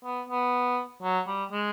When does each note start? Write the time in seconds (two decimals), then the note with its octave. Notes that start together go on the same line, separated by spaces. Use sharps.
0.05 B3
0.29 B3
1.02 F#3
1.27 G3
1.52 G#3